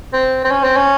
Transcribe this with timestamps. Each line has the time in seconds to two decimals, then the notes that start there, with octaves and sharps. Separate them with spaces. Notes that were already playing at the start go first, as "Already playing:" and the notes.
0.13 C4
0.45 C4
0.51 C#4
0.64 C4
0.77 C#4